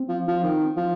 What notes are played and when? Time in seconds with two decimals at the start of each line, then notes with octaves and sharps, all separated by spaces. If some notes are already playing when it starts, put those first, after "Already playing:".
Already playing: C4
0.09 F3
0.28 F3
0.43 D#3
0.77 F3